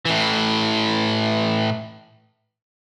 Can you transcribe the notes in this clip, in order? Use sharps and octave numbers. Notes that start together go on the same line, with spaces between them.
A2 E3